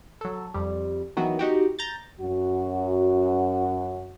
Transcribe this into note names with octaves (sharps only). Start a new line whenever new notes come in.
F#3 A4
F2 G3
D#3 E3 F#3 B3 F#4
D#4 F#4 G4
A#5 G6 A6
F#2 F#4